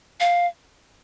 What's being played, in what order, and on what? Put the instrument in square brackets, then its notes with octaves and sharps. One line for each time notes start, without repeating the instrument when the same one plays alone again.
[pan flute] F5